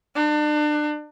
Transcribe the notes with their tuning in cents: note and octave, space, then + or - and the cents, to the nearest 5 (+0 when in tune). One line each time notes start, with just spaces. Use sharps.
D4 +35